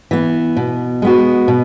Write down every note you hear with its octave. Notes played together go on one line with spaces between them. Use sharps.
E3 B3
B2
G#3 B3 F#4
B2